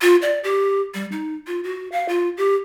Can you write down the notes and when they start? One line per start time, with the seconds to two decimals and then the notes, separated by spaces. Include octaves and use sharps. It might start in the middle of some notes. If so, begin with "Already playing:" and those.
0.02 F4
0.22 D5
0.44 G4
0.94 G3
1.12 D#4
1.47 F4
1.64 F#4
1.92 F5
2.09 F4
2.37 G4